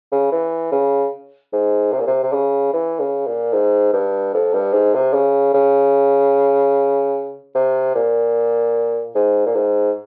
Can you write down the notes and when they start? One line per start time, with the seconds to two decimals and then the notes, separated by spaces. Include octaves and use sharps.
0.12 C#3
0.32 E3
0.72 C#3
1.53 G#2
1.92 C3
2.00 A#2
2.07 C3
2.23 C3
2.33 C#3
2.73 E3
2.99 C#3
3.26 A#2
3.53 G#2
3.93 G2
4.34 F2
4.54 G2
4.73 G#2
4.94 C3
5.14 C#3
5.54 C#3
7.55 C3
7.95 A#2
9.15 G#2
9.46 A#2
9.55 G#2